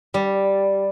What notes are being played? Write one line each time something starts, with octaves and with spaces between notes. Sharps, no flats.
G3